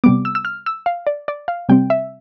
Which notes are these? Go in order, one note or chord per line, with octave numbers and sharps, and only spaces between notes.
C3 G3 B3 D6
E6
E6
F6
E6
F5
D5
D5
F5
C3 G3 C4 G5
E5